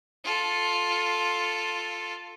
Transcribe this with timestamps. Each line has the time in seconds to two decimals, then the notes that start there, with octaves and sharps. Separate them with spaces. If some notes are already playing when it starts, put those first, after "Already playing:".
0.24 F4 A4